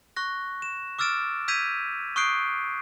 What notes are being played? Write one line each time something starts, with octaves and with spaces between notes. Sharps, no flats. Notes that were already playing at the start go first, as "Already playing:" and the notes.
C#6 F#6 A#6
E7
D6 E6 F6 A6 D7 E7
E6 G6 G#6 B6 D#7 F7
C#6 D#6 F#6 G6 C7 D7